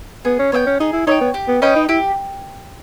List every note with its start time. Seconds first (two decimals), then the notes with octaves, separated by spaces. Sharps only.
0.25 B3 G#4
0.39 C#4
0.52 B3 C#5 E5 G5
0.66 C#4
0.80 D#4 G#4
0.93 E4
1.07 D#4 C#5 E5
1.11 G5
1.21 B3
1.34 G4
1.48 B3
1.62 C#4 B4 D#5 G5
1.76 D#4
1.89 E4 G4